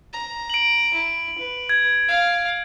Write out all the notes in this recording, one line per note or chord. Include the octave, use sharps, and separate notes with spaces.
A#5
D7 F#7
E4
B4
G#6
F5